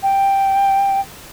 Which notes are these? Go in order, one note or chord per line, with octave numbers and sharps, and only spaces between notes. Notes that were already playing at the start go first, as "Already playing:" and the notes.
G5